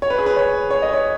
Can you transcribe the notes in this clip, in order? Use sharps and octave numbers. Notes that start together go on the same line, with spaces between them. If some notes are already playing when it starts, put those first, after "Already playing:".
C#5
B4
G#4
B4
C#5
C#5
D#5
C#5